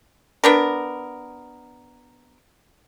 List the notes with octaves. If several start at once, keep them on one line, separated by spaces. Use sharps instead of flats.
B3 D4 A#4